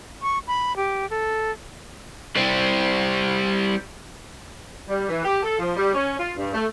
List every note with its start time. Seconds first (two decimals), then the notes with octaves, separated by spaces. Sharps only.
0.22 C#6
0.47 B5
0.77 G4
1.10 A4
2.37 G3 C4
4.89 G3
5.09 E3
5.24 G4
5.43 A4
5.59 F3
5.77 G3
5.94 C#4
6.19 F4
6.37 G2
6.54 A3